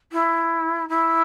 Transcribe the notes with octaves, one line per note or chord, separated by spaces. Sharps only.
E4
E4